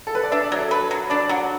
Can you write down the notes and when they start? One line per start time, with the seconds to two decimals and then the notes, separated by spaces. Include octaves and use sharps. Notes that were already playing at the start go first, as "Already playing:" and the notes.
0.07 A4
0.15 B4
0.23 D5
0.32 D4 E5
0.44 D5
0.52 F#3
0.58 A4
0.71 B4
0.91 F#3
1.10 D4 D5
1.29 F#3 F#5